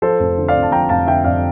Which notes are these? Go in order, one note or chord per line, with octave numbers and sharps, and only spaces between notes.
F3 A4 C5
F1
D3
D5 F5
F2
A5
F3 G5 A#5
F1 F5 A5
D3 E5 G5
F2 D5 F5